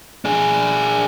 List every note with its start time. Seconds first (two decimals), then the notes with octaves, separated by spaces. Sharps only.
0.25 D4 G#4